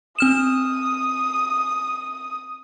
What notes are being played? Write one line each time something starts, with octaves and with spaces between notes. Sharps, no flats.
C4 D#6 F6 E7